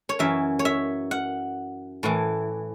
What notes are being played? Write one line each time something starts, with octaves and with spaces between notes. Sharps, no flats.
C#5
F#2 E3 E5
C#5
E5
F#5
A2 E3